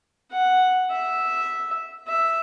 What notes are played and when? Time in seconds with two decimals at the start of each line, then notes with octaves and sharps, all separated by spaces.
0.32 F#5
0.91 E5
2.08 E5